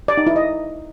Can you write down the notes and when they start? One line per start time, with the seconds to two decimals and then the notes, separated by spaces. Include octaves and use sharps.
0.08 D5
0.17 D#4
0.27 E4
0.36 D#5